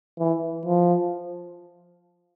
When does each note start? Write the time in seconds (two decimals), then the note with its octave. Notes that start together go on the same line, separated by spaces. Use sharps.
0.19 E3
0.66 F3